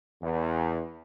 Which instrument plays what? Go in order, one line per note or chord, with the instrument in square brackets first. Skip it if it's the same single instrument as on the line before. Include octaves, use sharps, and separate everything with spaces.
[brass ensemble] E2